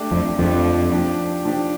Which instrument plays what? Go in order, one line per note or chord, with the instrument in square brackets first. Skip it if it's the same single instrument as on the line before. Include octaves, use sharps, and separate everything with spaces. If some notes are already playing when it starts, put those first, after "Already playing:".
Already playing: [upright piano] A3 D4 G4
[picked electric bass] F2 F3
[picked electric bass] F2 F3 [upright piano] A3 D4 G4
[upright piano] F3 D4 G4
F3 D4 G4